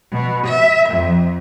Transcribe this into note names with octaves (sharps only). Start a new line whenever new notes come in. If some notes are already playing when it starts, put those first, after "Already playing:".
B2
E5
F2